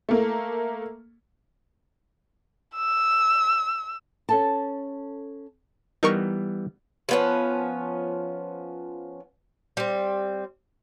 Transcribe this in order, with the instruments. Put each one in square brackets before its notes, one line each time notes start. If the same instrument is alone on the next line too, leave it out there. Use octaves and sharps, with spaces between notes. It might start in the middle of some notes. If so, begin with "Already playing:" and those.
[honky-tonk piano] A3 A#3
[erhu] E6
[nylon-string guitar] C#4 A4 A5
[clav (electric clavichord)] E3 G3 B3 [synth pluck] D#4 A#4 C#6
[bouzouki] F3 B3 C#4
G3 C4